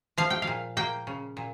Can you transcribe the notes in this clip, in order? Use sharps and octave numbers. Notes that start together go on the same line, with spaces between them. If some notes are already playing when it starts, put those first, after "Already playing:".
F3 F5
G5
F5
A#2
A#3 G5
C#3
A#2